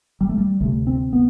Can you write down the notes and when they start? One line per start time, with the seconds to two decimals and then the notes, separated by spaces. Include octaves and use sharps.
0.21 G3
0.29 A3
0.38 G3
0.60 D2 C3 A3
0.87 C4
1.13 B3